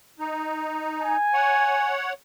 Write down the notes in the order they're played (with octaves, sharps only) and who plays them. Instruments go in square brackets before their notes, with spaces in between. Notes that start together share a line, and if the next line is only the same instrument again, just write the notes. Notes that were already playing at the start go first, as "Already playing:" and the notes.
[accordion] D#4
[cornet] G#5
[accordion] C#5 F#5